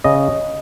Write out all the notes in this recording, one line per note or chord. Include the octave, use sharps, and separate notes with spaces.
C#3 D#5